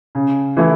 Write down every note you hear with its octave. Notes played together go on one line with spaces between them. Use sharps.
C#3
E3 A3 E4